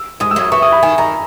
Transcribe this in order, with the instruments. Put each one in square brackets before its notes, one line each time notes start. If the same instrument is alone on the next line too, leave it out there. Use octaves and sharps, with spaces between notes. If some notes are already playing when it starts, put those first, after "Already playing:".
Already playing: [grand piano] E6
[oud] G#2 G#3 [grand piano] D#6
[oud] F#2 F#3 [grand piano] E6
[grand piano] D#6
[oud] E3 [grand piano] C#6
[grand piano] D#6
B5
[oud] D#3 [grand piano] G#5
[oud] D#3 [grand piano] A#5